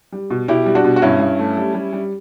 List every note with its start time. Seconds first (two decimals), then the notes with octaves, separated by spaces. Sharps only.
0.12 G3
0.30 B2
0.48 B2 E4 G4
0.66 G3
0.75 D4 F#4
0.84 B2
0.96 F#4
1.02 G2 C#4 E4
1.20 G2
1.39 A3
1.57 G3
1.74 G3
1.93 G3